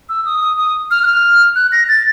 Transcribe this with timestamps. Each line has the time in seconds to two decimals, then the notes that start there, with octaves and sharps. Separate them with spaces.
0.09 E6
0.25 D#6
0.41 D#6
0.58 D#6
0.91 F6
1.03 F#6
1.07 F6
1.56 F#6
1.72 A#6
1.88 A6